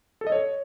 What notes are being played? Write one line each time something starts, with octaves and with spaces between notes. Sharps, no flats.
A4
D#5
C#5